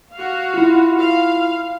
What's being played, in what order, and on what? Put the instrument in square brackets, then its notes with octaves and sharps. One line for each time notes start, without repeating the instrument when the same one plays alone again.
[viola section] F#4 F5
[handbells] E4 F4
[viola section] F5